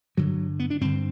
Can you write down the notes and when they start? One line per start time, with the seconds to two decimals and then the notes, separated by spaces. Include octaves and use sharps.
0.17 G2 D3 F#3
0.60 B3
0.70 D4
0.81 G2 D3 C4